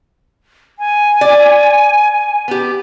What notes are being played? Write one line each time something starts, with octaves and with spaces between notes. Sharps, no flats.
G#5
D5
B3 G4